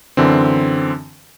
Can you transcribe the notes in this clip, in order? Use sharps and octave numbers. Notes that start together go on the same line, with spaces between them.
F#2 D3 E3 C4